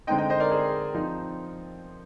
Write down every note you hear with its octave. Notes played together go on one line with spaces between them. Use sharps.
D3 G#3 C4 D#4 D#5 G5
D#5 G5
C5 D#5
A#4 D5
G#4 C5
F3 C4 D#4